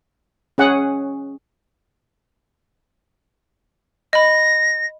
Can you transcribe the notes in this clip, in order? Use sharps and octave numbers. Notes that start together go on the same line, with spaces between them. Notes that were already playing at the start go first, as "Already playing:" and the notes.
C#4 G#4 F#5
D#5 B5 A#6